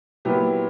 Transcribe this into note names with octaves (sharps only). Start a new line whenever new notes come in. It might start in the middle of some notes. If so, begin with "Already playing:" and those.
A#2 F#3 B3 E4 G4